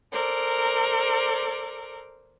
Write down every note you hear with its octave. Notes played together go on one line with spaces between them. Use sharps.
A4 A#4 C5 D5